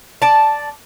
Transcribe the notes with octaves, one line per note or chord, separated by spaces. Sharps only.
D5 A5